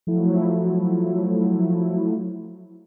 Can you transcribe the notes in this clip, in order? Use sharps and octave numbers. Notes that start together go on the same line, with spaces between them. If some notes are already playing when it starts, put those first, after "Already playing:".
F3 F#3 A3 E4